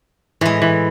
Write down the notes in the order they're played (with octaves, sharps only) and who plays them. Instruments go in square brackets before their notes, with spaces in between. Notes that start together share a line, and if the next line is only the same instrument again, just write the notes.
[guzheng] A2 G#3 [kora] E3
[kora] E3